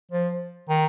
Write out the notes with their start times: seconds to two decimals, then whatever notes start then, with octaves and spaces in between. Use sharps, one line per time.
0.11 F3
0.69 D#3